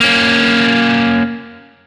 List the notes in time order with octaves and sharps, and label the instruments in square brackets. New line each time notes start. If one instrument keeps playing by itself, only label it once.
[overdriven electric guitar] A#3 C#4